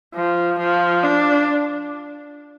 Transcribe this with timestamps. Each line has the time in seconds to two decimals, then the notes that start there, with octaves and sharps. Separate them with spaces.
0.15 F3
0.59 F3
1.04 D4